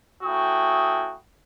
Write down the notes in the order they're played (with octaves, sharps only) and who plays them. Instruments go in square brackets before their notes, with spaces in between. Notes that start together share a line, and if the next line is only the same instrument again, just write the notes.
[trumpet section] A3 C#4 E4 F#4 G5 D#6